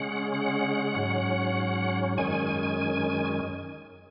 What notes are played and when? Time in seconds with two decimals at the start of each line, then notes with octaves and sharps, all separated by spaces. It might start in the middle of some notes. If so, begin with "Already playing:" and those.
Already playing: C#3 G#3 C#4 F#5
0.34 F#5
0.95 G#2 F#3 C#4
2.18 F#2 D#3 G#3 C#4 G#5